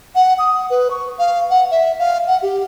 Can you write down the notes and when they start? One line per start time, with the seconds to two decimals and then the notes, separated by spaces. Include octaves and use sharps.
0.15 F#5
0.39 D#6
0.70 B4
0.91 C#6
1.19 F5
1.50 F#5
1.71 E5
1.99 F5
2.27 F#5
2.42 G4